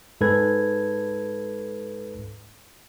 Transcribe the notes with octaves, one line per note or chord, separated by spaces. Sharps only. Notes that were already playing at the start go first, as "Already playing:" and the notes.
G#2 A4 B4 G#6